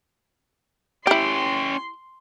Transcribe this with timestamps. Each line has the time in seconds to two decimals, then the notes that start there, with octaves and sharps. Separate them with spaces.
1.07 C#4 E4 G4 G5 C6